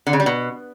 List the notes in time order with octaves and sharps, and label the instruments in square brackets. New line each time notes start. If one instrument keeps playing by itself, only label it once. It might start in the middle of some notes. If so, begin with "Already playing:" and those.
[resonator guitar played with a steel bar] D3
C#3
G3
B2